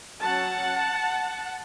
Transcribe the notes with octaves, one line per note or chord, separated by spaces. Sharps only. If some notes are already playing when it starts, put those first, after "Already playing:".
F#3 C#4 F#5 A5